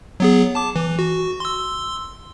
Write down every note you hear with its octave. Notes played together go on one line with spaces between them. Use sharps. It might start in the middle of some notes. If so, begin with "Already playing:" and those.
F#3 B3 G#4
A5 D6
E3
F#4
C6 E6